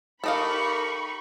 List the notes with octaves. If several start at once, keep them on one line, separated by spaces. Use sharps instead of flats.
D#4 G4 A4 A#4 D#5 F5 B5 C#6